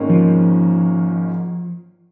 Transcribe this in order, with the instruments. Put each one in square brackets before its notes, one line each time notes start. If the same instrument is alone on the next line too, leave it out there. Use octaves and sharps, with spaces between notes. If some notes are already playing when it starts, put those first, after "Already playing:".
Already playing: [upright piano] G#1 G#2 D#3 A#3 C#4
[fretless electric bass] F3